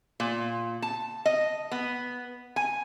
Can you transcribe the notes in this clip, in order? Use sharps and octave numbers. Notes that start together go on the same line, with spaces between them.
A#2
A5
D#5
B3
G#5